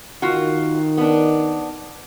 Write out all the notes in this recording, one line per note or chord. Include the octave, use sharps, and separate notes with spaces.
D#3 F4 F#4
B3 D4